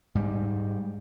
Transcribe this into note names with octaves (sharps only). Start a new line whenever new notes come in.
G#2 G3